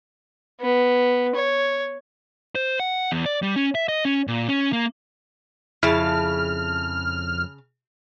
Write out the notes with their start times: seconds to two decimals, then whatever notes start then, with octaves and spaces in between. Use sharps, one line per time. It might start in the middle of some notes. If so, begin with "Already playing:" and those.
0.61 B3
1.35 C#5
2.55 C5
2.80 F#5
3.12 E2
3.26 D5
3.42 G3
3.56 C#4
3.75 E5
3.88 D#5
4.05 C#4
4.28 A#2
4.48 C#4
4.73 A#3
5.83 F2 C#3 E4 A5 F6